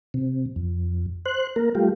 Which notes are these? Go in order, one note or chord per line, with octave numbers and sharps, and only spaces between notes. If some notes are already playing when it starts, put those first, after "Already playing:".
C3
F2
C5 F#6
A#3 A#4
G3 A3 F4 G4